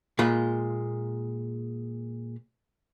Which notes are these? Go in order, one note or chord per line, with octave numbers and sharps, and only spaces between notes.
A#2 G#3 F4 B5